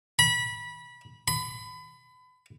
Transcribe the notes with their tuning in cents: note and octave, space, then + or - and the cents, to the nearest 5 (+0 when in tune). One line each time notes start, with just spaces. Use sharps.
B5 -25
B5 +30